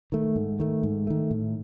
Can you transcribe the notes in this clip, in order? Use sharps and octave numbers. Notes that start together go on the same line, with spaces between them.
D#3 A3
G#2
D#3 A3
G#2
D#3 A3
A2